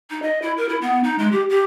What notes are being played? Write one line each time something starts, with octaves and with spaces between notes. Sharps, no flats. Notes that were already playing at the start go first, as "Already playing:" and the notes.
D#4
D#5
E4
A#4
E4
B3
D#4
G#3
G4
G4